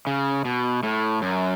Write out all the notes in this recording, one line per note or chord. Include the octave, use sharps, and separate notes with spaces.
C#3
B2
A2
F#2